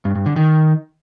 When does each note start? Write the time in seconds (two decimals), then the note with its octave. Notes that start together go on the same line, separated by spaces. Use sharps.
0.05 G2
0.15 G2
0.26 D3
0.36 D#3